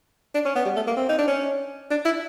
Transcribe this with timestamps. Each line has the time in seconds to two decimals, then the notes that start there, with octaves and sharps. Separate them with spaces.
0.34 D4
0.45 C#4
0.55 B3
0.65 G3
0.76 A3
0.87 A#3
0.97 C4
1.09 D#4
1.18 D4
1.28 C#4
1.90 D4
2.05 E4